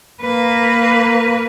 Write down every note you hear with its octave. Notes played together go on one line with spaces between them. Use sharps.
A#3 B4